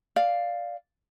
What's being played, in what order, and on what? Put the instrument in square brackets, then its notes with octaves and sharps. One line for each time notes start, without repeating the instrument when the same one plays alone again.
[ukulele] D5 F5